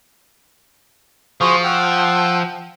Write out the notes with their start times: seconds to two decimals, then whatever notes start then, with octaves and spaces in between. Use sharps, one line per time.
1.41 F3 F#4 G#4 C5
1.64 F#5 G5 E6